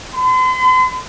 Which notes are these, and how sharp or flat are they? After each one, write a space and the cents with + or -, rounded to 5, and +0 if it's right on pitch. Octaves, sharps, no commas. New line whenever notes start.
C6 -45